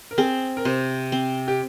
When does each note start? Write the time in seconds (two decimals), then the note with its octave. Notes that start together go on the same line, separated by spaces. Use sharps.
0.11 A#4
0.18 C4 G#4
0.57 A#4
0.65 C3 C5
1.12 C4
1.48 G4